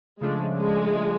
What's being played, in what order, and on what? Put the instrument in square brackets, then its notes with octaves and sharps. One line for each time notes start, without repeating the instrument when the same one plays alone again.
[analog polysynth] C#3 F3 A3 D4 [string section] G#3
[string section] G#3